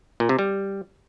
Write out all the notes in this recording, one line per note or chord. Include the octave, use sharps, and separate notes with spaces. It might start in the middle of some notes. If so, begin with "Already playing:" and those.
A#2
C3
G3